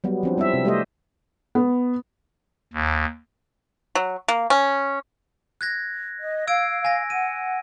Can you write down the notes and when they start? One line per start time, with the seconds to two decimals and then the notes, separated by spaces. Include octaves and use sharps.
0.04 F#3 G3 B3
0.23 F3 C4 D4
0.38 G3 C4 E4 E5
0.54 C3
0.65 G3 A3 G4 C5 D#5 E5
1.55 B3
2.73 D#2
3.95 F#3
4.28 A#3
4.50 C#4
5.61 F#6 G#6 A#6
6.20 D#5
6.47 F5 E6 G#6 D7
6.85 G#5 A#6
7.10 F#5 D#7